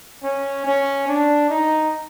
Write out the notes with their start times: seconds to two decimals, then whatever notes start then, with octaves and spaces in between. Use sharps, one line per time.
0.23 C#4
0.65 C#4
1.08 D4
1.50 D#4